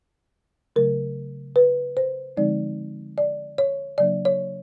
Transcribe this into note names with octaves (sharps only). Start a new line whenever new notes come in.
C#3 F#3 A3 A#4
B4
C5
D3 F3 G#3 C4 D#4 D5
D5
C#5
C#3 F#3 A#3 D4 D5
C#5